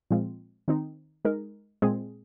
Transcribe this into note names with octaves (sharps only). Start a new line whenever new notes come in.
A#2 F3 G#3 C4 F4
D#3 C4 D#4
G#3 D#4 A#4
A#2 G#3 C4 G#4